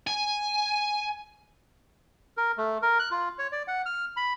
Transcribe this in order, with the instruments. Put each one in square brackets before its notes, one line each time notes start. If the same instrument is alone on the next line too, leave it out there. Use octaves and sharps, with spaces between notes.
[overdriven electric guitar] G#5
[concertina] A#4
A3
A#4
F#6
F4
C#5
D5
F#5
F6
B5